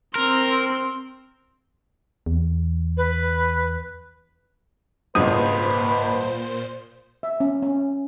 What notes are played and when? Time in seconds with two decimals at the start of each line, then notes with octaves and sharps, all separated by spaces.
0.16 C4 A#4 C6
2.26 E2
2.97 B4
5.15 G#1 C#2 G2 A#2 B4 C5 D#6
7.23 E5
7.40 C#4
7.62 C#4